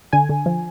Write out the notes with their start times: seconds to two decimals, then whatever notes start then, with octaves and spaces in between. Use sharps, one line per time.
0.13 D3 G#5
0.29 D3
0.46 F3